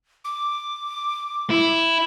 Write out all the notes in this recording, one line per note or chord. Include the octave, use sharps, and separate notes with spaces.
D6
E4